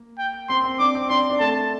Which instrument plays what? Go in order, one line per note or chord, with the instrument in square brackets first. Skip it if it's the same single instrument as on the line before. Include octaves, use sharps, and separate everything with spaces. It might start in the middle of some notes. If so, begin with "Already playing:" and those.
Already playing: [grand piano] A#3
[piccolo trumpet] G5
[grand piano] C4 [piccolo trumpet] C6
[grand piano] C4
[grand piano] D4 [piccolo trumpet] D6
[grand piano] C4
[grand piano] D4 [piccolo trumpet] C6
[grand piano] C4
D4
[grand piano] A3 [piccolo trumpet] A5